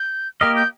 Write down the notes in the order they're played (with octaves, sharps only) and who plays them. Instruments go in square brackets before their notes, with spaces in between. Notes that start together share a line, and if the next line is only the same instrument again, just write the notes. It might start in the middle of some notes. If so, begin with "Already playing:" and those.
Already playing: [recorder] G6
[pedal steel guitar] A#3 G4 A#4 D#5 [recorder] F6
[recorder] G6